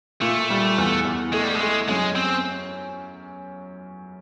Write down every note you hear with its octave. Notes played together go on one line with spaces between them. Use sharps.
A#2 A3
G3
E2
E2
G#3 A3
G3
G#3
A3
F#2 G#3
C4